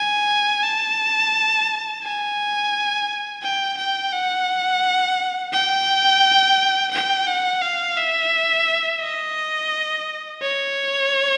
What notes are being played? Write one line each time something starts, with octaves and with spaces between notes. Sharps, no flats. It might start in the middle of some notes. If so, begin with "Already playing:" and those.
Already playing: G#5
A5
G#5
G5
G5
F#5
G5
G5
F#5
F5
E5
D#5
C#5